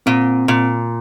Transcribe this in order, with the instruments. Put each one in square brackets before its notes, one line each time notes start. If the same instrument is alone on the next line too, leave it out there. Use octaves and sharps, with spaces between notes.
[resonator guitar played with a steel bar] A#2 [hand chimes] C4
[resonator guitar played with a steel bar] A#2